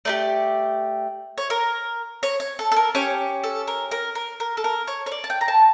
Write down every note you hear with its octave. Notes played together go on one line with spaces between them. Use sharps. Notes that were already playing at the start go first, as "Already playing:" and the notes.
A3 D4 G4 D5
C#5
A#4
C#5
C#5
A4
A4
A#4
C#4 G4 C#5
A4
A#4
A#4
A#4
A#4
A4
A#4
C#5
C#5
D5
A5
G5
A#5
A5